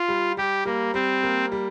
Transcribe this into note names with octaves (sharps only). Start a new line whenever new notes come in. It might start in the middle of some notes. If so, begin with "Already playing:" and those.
Already playing: F4
G3
G3 G4
G3 A#3
G3 C4
A#3
G3